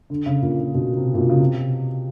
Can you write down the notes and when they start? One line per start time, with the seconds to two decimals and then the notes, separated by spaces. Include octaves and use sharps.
0.10 D3
0.26 C#3
0.42 A#2
0.59 A#2
0.74 B2
0.97 C3
1.14 A#2
1.18 B2
1.29 C#3
1.39 C3